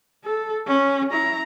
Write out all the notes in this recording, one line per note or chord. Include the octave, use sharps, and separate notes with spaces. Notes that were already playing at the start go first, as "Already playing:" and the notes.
A4
C#4
E4 A#5